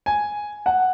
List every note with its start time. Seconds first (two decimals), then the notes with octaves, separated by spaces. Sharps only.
0.06 G#5
0.66 F#5